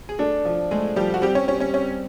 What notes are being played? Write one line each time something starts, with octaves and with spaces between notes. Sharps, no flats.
G#4
A3 D4 A4
F3
G#3 A3 G#4
F3 G3 G4
F#4
G3 C4 G4
C#4 C#5
G3 C#4 C#5
C#4 C#5
C4 C#4 C#5